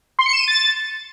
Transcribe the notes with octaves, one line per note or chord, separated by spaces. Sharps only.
C6
C#7
E7
D#7
A6